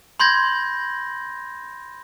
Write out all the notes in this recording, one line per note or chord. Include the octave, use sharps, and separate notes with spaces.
B5 C6 G6 G#6 A#6